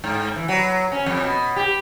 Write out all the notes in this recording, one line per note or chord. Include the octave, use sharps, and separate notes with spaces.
G#2
E3
F#3
C#4
F2
B2
G4